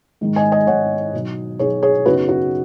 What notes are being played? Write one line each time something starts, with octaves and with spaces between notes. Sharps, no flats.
G#2 D#3 G#3
D#5 G#5
D#5 G#5
G#2 D#3 G#3 C#5 F#5
B2 F#3 D#4
B2 F#3 D#4 G#4 C#5
G#4 C#5
F#2 C#3 B3 D#4 F#4 B4
F#4